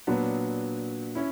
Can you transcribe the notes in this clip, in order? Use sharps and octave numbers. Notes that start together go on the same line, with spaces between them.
A#2 F#3 B3 D4
C#4 E4